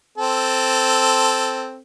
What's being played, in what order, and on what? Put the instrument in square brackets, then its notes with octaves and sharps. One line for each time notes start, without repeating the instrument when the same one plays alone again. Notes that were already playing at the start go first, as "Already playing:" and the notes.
[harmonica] C4 A4